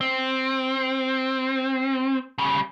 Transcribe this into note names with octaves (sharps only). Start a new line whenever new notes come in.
C4
C#3 G3